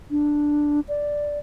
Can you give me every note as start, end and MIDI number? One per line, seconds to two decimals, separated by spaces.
0.11 0.80 62
0.89 1.39 74